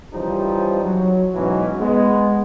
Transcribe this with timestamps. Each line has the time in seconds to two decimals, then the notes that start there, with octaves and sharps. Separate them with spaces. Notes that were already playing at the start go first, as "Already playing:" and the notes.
0.13 C#3 E3 F3 G3 D#4 C5
0.83 F#3
1.35 G#2 B2 E3 F#3 C#4 D#4
1.79 G#3 B3